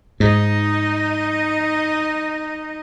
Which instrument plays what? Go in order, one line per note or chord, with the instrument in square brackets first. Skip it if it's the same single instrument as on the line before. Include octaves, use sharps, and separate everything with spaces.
[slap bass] G#2 [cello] D#4 D#5